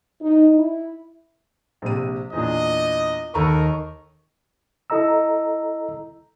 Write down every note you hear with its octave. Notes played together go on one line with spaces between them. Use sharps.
D#4
E4
A#1 C3 D#7
E2 A#2 D4 D#5
D#2 A4 A#4 D#5 A#5 B5 C#6
E4 A4 D#5 A#5 E6